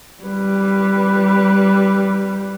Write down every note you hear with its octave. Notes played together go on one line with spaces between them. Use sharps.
G3 B4